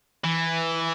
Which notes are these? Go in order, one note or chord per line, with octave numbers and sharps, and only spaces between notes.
E3